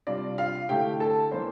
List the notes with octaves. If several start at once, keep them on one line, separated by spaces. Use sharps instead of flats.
C3 G3 D4 F4 D5
F4 F5
D3 A3 E4 G4 G5
A4 A5
E3 A#3 D4 C5 C6